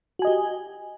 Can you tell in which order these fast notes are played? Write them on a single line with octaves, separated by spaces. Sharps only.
F#4 G#5 D#5 G4